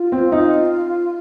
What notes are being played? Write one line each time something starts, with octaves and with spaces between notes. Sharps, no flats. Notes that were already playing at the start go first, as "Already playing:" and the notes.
Already playing: F4
C4
D#4